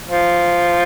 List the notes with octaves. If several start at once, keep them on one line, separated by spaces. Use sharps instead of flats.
F3